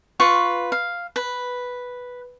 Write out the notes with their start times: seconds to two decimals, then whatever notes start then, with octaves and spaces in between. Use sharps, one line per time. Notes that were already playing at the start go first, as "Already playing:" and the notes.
0.20 F4 B4 C#6
0.72 F5
1.16 B4